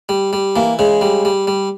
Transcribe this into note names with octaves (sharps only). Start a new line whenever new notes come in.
G3
G3
E3 A#3
C#3 G#3
G3
G3
G3